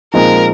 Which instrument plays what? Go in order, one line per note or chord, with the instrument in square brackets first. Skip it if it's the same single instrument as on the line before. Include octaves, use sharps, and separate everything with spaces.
[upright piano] A#2 F3 G#3 C4 D#4 [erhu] A#4